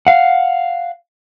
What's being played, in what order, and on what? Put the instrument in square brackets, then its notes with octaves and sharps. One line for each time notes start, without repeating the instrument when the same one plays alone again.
[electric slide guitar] F5 F#5